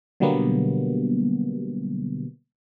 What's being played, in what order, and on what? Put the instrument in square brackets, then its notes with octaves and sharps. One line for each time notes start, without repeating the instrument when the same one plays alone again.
[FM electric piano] B2 D3 F#3 G3 A#3 B3